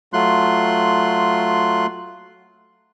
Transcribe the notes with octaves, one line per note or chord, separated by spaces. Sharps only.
F#3 A3 F4 C6 F#6